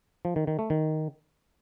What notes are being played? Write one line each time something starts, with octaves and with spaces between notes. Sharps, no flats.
F3
D#3
D#3
A3
D#3